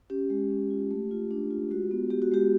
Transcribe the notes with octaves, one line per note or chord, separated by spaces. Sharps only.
C#4 G4
G#3
C#4
F4
A3
F4
D4
F4
G#3 F#4
B3
B3 G4
F#4
G#3 G4